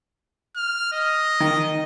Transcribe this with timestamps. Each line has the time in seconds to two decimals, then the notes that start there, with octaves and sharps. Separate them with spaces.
0.56 F6
0.93 D#5
1.40 D#3